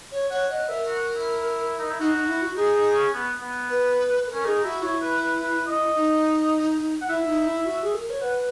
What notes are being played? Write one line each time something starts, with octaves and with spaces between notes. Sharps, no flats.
C#5
C#5 F#5
D#5 F#5
A#4 E5
F#4
E4
D#4
E4
D#4 F#4
D#4
D#4
E4
F#4
D#4 G#4
D#4
C#4
B3
B3
B4
A#4
C#4
D#4 G#4
E4 F#4
E4 C#5
B4
B4
B4
D#5
D#4
F#5
E4 E5
E4
D#4
E4
F#4
G#4
A#4
C#5
B4 F#5